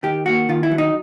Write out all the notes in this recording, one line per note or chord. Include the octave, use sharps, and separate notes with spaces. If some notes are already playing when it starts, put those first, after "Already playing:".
D#3 G4
A#3 F#4
D#3 F4
E4
F#3
D#4